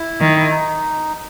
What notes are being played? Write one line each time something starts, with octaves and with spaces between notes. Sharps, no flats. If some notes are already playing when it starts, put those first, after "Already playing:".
Already playing: E4
D#3
E4
D#4